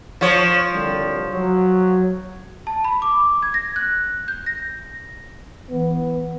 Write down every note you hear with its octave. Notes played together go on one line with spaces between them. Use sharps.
F3 C#5
C2 D3 G3
F#3
A5
B5
D6
G#6
A#6
F#6
G6
A#6
E3 B3